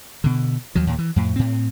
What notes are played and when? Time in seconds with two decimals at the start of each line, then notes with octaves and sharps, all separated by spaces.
0.24 B2 D3
0.75 D#2 F3 F#3
0.87 D#2 A#2
0.98 E3
1.16 F2 A2
1.36 A2 C4